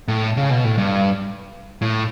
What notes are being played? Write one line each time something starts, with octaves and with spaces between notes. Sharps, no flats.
A2
C#3
B2
A2
G2
A2